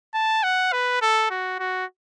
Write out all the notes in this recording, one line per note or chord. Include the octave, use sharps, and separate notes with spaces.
A5
F#5
B4
A4
F#4
F#4